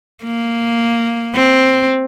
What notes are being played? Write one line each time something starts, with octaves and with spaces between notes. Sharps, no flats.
A#3
C4